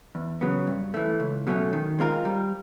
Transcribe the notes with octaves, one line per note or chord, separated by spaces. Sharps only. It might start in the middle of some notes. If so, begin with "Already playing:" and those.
E2
C#3 F#3 B3
G2
E3 A3
C#2
B2 F#3 A3 C#4
D#3
G#3 C4 F4 A#4
G3